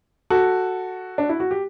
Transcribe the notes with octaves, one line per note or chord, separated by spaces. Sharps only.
F#4 A4
D4
E4
F#4
G4